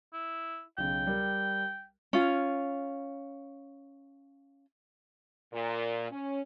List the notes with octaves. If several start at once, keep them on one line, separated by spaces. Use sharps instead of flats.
E4
B1 C#3 G5
G3 A#4
C#4 F4
A#2
C#4